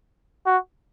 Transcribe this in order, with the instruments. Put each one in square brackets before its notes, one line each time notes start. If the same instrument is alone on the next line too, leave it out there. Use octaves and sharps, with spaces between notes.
[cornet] F#4